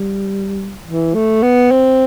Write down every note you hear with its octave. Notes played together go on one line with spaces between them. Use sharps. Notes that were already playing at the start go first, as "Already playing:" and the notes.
Already playing: G3
E3
A3
B3
C4